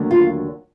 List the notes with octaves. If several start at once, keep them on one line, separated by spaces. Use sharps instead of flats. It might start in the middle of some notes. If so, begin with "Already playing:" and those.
Already playing: D#2 D3 F#3 A3
F4